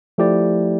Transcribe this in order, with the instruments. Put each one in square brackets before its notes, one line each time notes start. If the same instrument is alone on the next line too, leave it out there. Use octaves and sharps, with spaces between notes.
[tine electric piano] F3 A3 E4 G4 D5